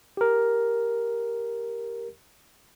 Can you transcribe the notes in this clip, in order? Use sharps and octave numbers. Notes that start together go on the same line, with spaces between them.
G4 A#4